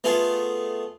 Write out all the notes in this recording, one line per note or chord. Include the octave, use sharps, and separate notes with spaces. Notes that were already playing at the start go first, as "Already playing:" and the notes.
A3 B3 F4 G#4